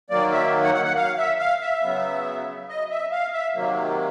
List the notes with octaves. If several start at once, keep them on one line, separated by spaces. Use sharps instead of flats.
D#3 F#3 A#3 D5
E5
F#5
F#5
F#5
F5
E5
F5
E5
C#3 F#3 B3
D#5
E5
F5
E5
C3 D#3 F#3 A#3